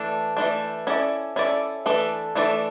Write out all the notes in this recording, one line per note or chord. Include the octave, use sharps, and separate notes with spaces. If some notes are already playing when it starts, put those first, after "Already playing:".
Already playing: E3 A3 D4
E3 A3 D4
C#4 E4 A4 D5
C#4 E4 A4 D5
E3 A3 D4 A4 D5
E3 A3 D4 A4 D5